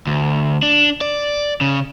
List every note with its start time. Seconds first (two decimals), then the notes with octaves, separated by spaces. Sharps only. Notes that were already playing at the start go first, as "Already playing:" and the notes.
0.07 D2
0.63 D4
1.01 D5
1.61 C#3